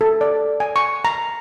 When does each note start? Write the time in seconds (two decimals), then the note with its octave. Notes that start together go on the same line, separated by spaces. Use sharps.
0.01 A4
0.21 D5
0.60 G#5
0.76 C#6
1.05 A#5